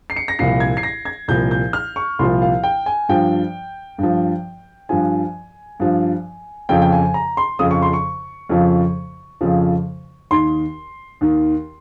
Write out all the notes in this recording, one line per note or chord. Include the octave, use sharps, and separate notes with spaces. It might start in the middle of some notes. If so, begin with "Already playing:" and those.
C7
C#7
A#6
C2 A#2 F3 C7
G#6
C7
A#6
G#6
C2 A#2 F3 G6
G6
F6
C#6
C2 A#2 F3 C6
F5
G5
G#5
G2 F3 G5
G2 F3
G2 F3 G#5
G2 F3
F2 C#3 F3 G5
G5
G#5
A#5
C6
F2 C#3 F3 D#6
C#6
C6
C#6
F2 C#3 F3
F2 C#3 F3
D#2 D#3 C6
D#2 D#3